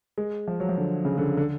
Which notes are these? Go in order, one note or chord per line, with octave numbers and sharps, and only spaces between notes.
G#3
F3
F#3
F3
D3
C#3
D3
D3